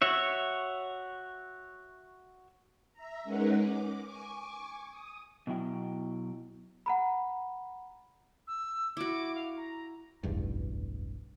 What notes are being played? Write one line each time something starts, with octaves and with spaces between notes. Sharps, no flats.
F#4 C#5 E5
E5 A#5
G#3 C#4 D#4 A#4 B4 F#5
D6
G#5 C#6 D6
D#6
B2 F#3 E4 G5
F#5 A#5 B5
E6
E4 F#4 D6
F5
A#5
F1 B1 E2 G2